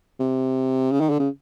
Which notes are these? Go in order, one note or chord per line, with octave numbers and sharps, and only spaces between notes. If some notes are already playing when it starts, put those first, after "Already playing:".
C3
C#3
D#3
D3
C#3